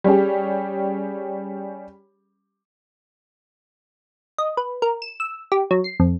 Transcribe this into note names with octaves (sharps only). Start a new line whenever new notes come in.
G3 C#4 G4 G#4
D#5
B4
A#4
E7
E6
G4
F#3
C7
F2